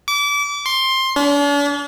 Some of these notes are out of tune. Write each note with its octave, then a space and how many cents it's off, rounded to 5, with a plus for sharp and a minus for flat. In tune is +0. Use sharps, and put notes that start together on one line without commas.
D6 -30
C6 +15
D4 -45